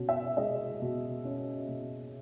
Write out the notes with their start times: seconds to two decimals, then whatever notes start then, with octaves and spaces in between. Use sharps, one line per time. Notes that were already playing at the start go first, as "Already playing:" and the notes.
Already playing: B2 C#4
0.09 E5
0.37 G#3 D#5
0.82 B2
1.25 C#4
1.68 B2